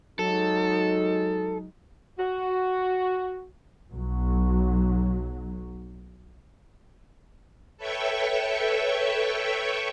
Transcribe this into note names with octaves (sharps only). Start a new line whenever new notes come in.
F#3 G#3 D#4 A4
F#4
B1 F#3
A4 B4 C#5 E5 G5 C#6